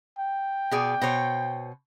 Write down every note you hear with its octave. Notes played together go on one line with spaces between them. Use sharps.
G5
B2 G#4 D5
B2 C5 C#5